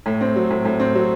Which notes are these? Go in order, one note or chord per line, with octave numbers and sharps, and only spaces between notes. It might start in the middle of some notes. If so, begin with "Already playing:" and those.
A2
C4
F#3
A2
A2
C4
F#3